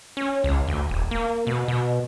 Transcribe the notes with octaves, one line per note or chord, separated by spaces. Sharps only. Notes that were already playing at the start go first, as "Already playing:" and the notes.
C#4
C#2
D2
D#1
A#3
B2
B2